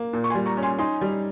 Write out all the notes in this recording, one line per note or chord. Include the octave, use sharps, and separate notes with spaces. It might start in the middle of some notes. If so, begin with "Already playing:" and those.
Already playing: A#3
A#2
C#6
G#5 C6
G3
A#5 C#6
C#4
G#5 C6
D#4 G#5 C6
G3